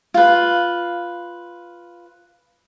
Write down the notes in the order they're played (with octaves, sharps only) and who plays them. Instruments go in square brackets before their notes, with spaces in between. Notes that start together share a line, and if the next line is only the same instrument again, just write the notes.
[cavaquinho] F4 B4